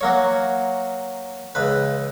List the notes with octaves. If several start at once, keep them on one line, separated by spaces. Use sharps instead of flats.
F#3 A#3 C#5
C#2 B4